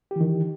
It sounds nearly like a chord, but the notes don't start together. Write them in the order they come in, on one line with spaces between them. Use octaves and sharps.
G4 E3 D#3